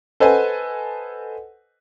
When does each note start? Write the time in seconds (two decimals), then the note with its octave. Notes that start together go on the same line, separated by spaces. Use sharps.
0.20 A4 B4 C5 D#5 F#5 G#5